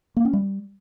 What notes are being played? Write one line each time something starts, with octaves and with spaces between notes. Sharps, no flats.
A#3
C#4
G3